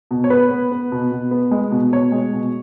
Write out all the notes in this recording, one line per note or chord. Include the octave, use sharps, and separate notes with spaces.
B2
C#5
B3 B4
B3
B3
B2
B2
B3
G#3
B2
B2 C#5
G#3
B2